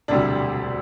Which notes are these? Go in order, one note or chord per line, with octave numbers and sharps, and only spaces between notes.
E1 D2 C3 G3 D4